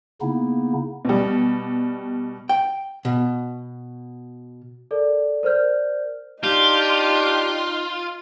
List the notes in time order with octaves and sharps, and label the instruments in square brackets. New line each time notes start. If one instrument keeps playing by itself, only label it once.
[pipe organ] C#3 A#3 B3 D#4 E4
[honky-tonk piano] B2 G3
[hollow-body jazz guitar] G5
B2
[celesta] A4 A#4 D5
A#4 C5 D5 F6 G6
[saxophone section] D4 G4 [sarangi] D#4 [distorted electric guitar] F4